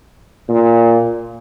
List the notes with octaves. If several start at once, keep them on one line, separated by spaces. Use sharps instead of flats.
A#2